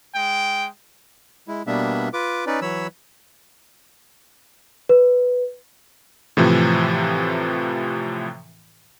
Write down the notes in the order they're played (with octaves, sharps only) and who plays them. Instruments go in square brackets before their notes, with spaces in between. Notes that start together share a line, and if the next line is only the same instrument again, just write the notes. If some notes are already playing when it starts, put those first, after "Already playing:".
[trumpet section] G#3 G5
[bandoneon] G#3 E4
B2 G3 A#3 B3 D4 E5
F4 B4 D6
C#4 D#4 B4 D5
E3 F#3 C#5 B5 E6
[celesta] B4
[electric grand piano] A2 C3 E3 F3